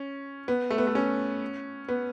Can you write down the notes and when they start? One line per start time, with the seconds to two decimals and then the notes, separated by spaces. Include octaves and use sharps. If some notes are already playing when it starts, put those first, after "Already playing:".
Already playing: C#4
0.48 B3
0.70 A3
0.78 B3
0.87 A3
0.95 C#4
1.88 B3